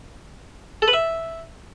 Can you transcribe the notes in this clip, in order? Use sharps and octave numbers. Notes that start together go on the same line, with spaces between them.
A4
B4
E5